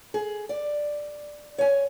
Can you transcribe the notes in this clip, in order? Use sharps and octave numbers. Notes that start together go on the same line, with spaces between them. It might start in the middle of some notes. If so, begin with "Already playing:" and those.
G#4
D5
C#5 G#5